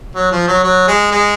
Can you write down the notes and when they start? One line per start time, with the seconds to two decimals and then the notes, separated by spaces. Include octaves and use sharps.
0.15 F#3
0.32 F3
0.47 F#3
0.64 F#3
0.88 G#3
1.12 G#3